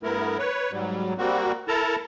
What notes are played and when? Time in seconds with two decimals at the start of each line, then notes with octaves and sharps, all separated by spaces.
0.03 G2 A3 B3 E4 A#4
0.39 B4 C#5
0.72 G#2 F#3 G3
1.18 G3 A#3 C4 F#4
1.68 E4 A4 A#4 A5 A#5